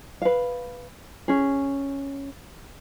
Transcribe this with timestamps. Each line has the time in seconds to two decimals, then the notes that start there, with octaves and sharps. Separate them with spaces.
0.22 B4 F5
1.28 C#4 G#4